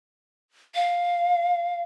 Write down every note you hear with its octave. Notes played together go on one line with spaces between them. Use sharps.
F5